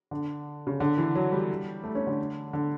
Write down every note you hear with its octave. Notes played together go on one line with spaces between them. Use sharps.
D3
C#3
D3
E3
F#3
G3
A3
C#4
D3
D3